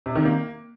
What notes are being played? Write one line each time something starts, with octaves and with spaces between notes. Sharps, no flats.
C3
D#3
A#3